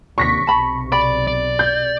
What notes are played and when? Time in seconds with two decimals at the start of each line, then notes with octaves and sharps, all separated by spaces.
0.18 D#2 C3 D4 C#6 A#6 B6
0.47 B1 C3 A5 B5
0.92 D5 B5
1.27 D5
1.59 G6